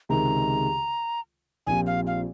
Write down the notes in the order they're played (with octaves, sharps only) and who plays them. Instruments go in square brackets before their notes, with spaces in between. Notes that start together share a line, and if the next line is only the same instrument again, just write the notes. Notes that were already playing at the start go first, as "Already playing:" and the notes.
[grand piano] C#2 C3 D#3 G#3 [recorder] A#5
[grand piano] A#1 A#2 F3 C4 G4 [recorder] G#5
[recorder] F5
F5